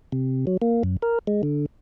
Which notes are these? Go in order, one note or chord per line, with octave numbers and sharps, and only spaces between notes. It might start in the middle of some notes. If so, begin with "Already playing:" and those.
C3
F#3
A#3
F#2
A#4
G#3
D3